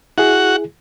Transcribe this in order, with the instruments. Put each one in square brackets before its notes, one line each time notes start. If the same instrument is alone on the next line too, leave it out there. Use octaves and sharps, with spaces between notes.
[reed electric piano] E4 G#4 [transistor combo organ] F#4 F#5